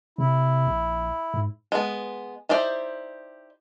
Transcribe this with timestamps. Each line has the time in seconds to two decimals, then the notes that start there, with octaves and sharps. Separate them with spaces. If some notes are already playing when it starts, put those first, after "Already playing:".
0.18 C3 E4
0.67 A#1
1.34 G#2
1.72 G#3 B3
2.49 D#4 E4 G4 C5 D5